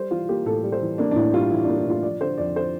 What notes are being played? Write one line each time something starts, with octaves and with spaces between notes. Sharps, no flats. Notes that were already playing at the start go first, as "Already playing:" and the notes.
Already playing: G3 C5
E3 F4
A#3 G4
A2 A4
G3
C5
E3
A#3 D4
D4
A2 E4
G3 F4
E3 E4
D4
A#3
E4
A2 F4
F3 D5
D3 C5
F2 D5
C5